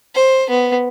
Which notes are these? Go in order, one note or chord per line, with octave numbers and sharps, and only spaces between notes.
C5
B3